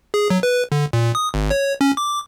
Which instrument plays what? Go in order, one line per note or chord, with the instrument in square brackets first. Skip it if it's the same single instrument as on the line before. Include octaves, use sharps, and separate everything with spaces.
[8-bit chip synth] G#4
F#3
B4
D3
A#2
D#6
G#1
C#5
C#4
D6